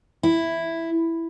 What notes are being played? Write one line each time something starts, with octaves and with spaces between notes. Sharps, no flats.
E4